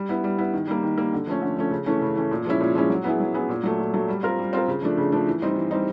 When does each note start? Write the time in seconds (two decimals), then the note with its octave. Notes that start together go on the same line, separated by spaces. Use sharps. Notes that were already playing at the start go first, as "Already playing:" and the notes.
Already playing: G3
0.09 B3 E4
0.24 G3
0.38 B3 E4
0.53 D#3
0.67 G3 A#3
0.83 D#3
0.98 G3 A#3
1.13 D3
1.27 F3 A3 C#4
1.42 D3
1.56 F3 A3 C#4
1.71 C#3
1.86 E3 A3 C#4
2.01 C#3
2.15 E3 A3 C#4
2.31 A#2
2.45 F3 G#3 C#4 E4
2.60 A#2
2.75 F3 G#3 C#4 E4
2.90 F#3
3.04 B3 E4 G#4
3.20 F#3
3.34 B3 E4 G#4
3.49 A#2
3.63 F#3 A3
3.79 A#2
3.94 F#3 A3
4.08 G3
4.23 C4 F4 A#4
4.38 G3
4.53 C4 F4 A#4
4.68 C#3
4.82 F3 A3 D4
4.98 C#3
5.12 F3 A3 D4
5.27 E3
5.42 G3 C4 D#4
5.56 E3
5.71 G3 C4 D#4